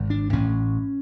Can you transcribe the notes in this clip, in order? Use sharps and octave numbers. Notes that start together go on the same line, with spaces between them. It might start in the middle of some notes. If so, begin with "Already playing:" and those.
Already playing: G#1 G#2
D4
A1 A2 C#4